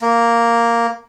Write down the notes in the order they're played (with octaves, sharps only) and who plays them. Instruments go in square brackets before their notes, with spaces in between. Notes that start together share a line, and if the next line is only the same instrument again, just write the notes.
[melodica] A#3